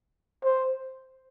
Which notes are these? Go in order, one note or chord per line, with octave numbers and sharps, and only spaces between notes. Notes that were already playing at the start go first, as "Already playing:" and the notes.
C5